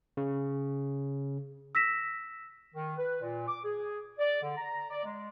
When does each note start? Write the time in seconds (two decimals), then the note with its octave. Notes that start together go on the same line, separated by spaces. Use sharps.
0.17 C#3
1.75 E6 A#6 B6 E7
2.74 D#3
2.97 B4
3.22 A#2
3.47 D6
3.64 G#4
4.19 D5
4.42 D3
4.56 A#5
4.90 D5
5.04 G#3